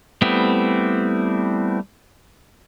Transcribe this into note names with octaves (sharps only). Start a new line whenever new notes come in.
G3 A3 B3 C4 E4